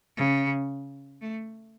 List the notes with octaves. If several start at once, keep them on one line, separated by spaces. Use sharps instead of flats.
C#3
A3